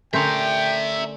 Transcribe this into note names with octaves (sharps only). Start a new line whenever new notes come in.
D3 A3 C#4 A#4 C5 E5 G5 A#5